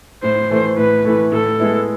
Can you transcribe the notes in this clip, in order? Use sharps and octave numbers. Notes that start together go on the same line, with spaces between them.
A2 C5
E3 A3
A2 B4
E3 A3
A2 A4
G#3 B3 E4